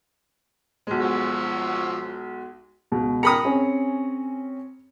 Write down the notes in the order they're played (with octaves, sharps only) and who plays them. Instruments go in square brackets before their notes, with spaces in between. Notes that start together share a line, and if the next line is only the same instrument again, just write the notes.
[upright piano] B1 G#3
[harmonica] F3 F#4 E6
[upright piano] C#2 B2
[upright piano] A#4 C#7 [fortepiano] A#5 B5 D#6
[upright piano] C4 C#4 G#4